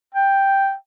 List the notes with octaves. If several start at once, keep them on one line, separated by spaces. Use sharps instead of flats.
G5